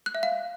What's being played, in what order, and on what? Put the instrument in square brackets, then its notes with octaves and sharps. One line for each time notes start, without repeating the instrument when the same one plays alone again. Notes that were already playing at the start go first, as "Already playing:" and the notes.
[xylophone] F#6
E5
F5